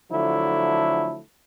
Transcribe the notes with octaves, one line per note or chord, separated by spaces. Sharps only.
D3 F3 F#3 A3 E4